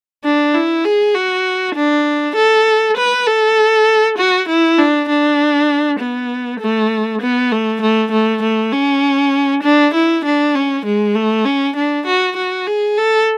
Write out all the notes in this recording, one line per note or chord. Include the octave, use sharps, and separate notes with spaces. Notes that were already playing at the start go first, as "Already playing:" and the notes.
D4
E4
G#4
F#4
D4
A4
B4
A4
F#4
E4
D4
D4
B3
A3
B3
A3
A3
A3
A3
C#4
D4
E4
D4
C#4
G#3
A3
C#4
D4
F#4
F#4
G#4
A4